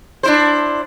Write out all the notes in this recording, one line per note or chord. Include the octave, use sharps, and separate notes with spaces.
D4 E4 C5